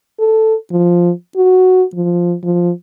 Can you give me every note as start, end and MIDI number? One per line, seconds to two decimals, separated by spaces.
0.19 0.55 69
0.71 1.11 53
1.36 1.83 66
1.94 2.35 53
2.43 2.71 53